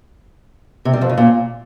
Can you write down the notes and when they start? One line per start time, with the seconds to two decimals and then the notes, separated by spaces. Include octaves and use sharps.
0.85 C3
0.93 G3
1.01 F2
1.09 C#3
1.17 A#2